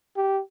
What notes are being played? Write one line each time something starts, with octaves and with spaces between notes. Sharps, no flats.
G4